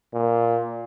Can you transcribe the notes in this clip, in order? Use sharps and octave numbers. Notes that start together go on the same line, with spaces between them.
A#2